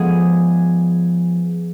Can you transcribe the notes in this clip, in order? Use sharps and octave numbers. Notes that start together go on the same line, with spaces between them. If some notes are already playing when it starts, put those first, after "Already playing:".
Already playing: F3 G#3 B3 G#4 G#5